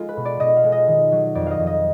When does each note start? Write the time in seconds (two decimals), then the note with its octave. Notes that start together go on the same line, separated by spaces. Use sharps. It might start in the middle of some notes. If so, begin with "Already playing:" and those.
Already playing: G#3 F4
0.09 B4
0.17 B2
0.25 D5
0.40 B2 D#5
0.57 F5
0.64 G#3
0.72 D#5
0.87 D#3
1.12 F#3
1.35 F2 D5
1.47 D#5 F5
1.59 F2
1.67 D#5